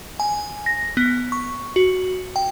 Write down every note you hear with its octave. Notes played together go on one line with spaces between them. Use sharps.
G#5
A#6
B3
C#6
F#4
G5